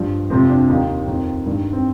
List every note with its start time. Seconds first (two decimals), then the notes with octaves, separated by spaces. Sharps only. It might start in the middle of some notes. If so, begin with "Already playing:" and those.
Already playing: G2 F3
0.30 F2 C3 F3 C4
0.49 D4
0.69 D#2 D#3 D#4
1.07 F2 D#3
1.46 G2 D#3
1.73 C4